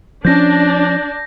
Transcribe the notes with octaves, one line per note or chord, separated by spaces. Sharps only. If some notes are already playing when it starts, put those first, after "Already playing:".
F3 C#4 D4 G6 A#6